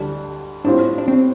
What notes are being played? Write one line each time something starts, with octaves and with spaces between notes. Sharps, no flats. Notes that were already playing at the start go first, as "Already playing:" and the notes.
Already playing: D2 D3 G3 D4
A2 G3 C4 D4 F4
D4
C4